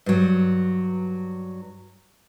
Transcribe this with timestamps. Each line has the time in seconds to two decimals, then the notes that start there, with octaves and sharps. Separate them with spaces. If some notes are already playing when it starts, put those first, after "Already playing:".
0.06 G2 F#3